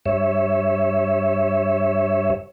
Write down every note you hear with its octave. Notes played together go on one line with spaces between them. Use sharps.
G2 C#5 E5